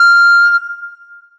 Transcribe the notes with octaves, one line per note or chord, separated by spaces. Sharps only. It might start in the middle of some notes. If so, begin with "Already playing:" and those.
Already playing: F6